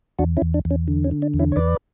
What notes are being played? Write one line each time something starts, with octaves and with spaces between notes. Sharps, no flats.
E2 D4 F#4
C#4 E4
E2
D4
E2
C#4
D3
C#4
D3
D4
E2
C#4 E4
C#5
E2 B4 D5